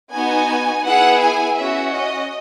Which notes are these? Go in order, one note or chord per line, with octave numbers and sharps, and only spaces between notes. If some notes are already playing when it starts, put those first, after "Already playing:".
B3 D#4 F#4 G#5
B3 E4 G#4 F#5
G#5
C#4 F#4 E5
D#5